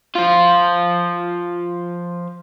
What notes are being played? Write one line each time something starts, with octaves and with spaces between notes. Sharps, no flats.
F3 F4